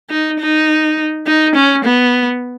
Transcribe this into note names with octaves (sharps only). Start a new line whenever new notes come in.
D#4
D#4
D#4
C#4
B3